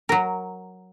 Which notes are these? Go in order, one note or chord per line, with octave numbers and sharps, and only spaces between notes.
F#3 A#4